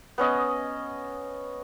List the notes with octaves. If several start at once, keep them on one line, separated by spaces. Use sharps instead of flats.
B3 C#4 D#5